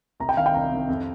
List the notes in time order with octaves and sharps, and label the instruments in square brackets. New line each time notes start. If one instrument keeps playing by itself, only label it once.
[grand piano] C2 [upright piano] A#5
[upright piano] G5
[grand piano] C3 D#3 [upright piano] F5
[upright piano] G5
[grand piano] C2 [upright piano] A#5
[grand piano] C3 D#3
F2